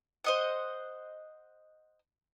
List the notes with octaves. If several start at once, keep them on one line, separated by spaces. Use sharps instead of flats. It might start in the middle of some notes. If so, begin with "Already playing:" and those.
C5 D#5 F#5